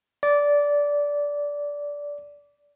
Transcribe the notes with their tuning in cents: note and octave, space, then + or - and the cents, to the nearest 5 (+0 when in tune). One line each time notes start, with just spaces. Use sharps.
D5 -15